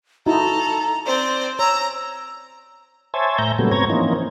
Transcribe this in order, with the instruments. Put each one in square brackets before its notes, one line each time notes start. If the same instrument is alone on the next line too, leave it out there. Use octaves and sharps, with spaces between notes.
[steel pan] D#4 E4 F#4 [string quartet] A4 [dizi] A#5
[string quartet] C4 C5 [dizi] D5
[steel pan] C#5 [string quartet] A#5 [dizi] E6
[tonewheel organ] C5 C#5 E5 G#5 A5
A2 E5 A#5 G6
A#2 C#3 F#3 G3 A3 B3
G#2 B3 C4 C#5 A#5 G#6
E3 F3 A#3 C4 C#4 D#4